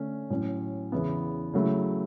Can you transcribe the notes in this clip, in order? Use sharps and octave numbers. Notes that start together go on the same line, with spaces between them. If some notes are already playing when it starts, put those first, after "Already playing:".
Already playing: D3 A3 C#4
A2 F#3 C#4
E2 C#3 E3 B3 E4
C#3 F#3 A3 E4